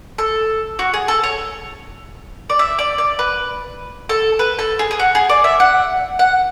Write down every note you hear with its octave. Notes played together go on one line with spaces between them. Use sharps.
A4
F#4
G#4
A4
C#5
D5
E5
D5
D5
B4
A4
B4
A4
G#4
G#4
F#4
G#4
D5
E5
F#5
F#5